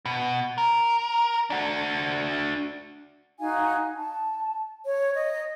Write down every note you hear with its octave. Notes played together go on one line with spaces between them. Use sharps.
B2
A#4
D4 F#4
D#4 F#4 F5 G#5
A5
C#5
D#5